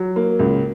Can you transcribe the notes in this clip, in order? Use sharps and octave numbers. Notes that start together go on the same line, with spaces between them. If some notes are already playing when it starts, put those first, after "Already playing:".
Already playing: F#3
A#3
C#2